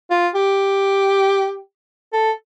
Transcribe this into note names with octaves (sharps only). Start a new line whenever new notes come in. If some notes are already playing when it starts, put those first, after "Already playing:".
F4
G4
A4